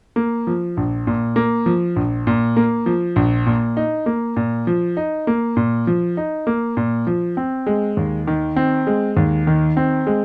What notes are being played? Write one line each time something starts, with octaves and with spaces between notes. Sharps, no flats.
A#3
F3
A#1
A#2
A#3
F3
A#1
A#2
A#3
F3
A#1
A#2
D#4
A#3
A#2
F3
D#4
A#3
A#2
F3
D#4
A#3
A#2
F3
C4
G#3
D#2
D#3
C4
G#3
D#2
D#3
C4
G#3